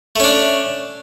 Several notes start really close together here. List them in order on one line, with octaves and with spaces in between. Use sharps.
A3 C#4 D4